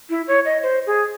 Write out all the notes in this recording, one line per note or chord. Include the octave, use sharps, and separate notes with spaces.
E4
C#5
D#5
C5
G#4